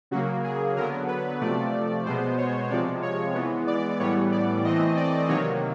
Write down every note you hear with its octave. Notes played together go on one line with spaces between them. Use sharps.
C#3 F#3 A#3 F#4
G#4
D3 F#3 B3 A#4
B4
C3 F3 A3 D5
B2 G#3 B3 C5
C#5
C3 F3 G#3 D5
C#5
E3 G#3 B3
D5
A2 E3 G3 B3 C#5
D5
E3 A3 C4 D#5
D5
C3 D#3 F#3 A#3 C#5